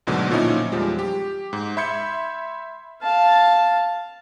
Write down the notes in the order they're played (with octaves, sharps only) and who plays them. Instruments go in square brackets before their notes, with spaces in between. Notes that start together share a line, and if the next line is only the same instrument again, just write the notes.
[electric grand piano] D2 G#2 B2 D3 F#3
A#2 F3 C#4 D#4 E4
E2 F3 G3 G#3
G4
G#2
E5 B5 C6 G6 G#6 C#7
[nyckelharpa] F5 A5